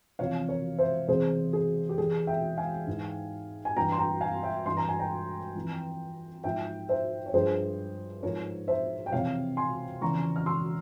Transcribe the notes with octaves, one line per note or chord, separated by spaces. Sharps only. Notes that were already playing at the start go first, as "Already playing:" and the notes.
E2 C3 F3 C#5 F5
A#4 C#5
C5 E5
E2 C3 E3 G#4 C5
G#4
G4
E2 E3 G#4
E5 G5
F5 G#5
G#2 E3
G#5
G2 E3 G5 A#5
C6
G5 A#5
F5 G#5
E5 G5
G2 E3 C6
A#5
G#5
G5 A#5
F2 E3
G#2 F3 E5 G5
C5 E5
C#5
G2 F3 G#4 C5
G#2 F3 A#4 C#5
C5 E5
G5
F2 C3 E3 C#5 F5
G#5 C6
E2 C#3 F3 A#5 C#6
F6
C6 E6